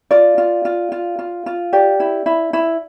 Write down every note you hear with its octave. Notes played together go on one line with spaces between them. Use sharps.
F4 D5
F4
F4
F4
F4
F4
G4 D5
E4
E4
E4